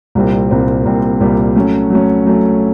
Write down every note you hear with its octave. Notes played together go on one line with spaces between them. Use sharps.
C2 A#2 G3 C4
C2 A#2 G3 C4
C2 A#2 G3 C4
C2 A#2 G3 C4
F#3 A3 C#4
F#3 A3 C#4
F#3 A3 C#4